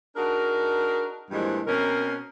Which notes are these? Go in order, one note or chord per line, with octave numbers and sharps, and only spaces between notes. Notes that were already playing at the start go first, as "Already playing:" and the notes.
D4 D#4 F#4 G#4 A#4
G2 A#2 E3 F3 G3 G#3
B2 C4 C#4 A#4